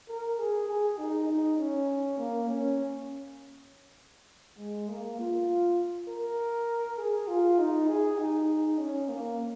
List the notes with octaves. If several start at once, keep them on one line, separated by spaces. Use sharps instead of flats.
A#4
G#4
G#4
D#4
D#4
C#4
A#3
C#4
G#3
A#3
F4
A#4
G#4
F4
D#4
G#4
D#4
C#4
A#3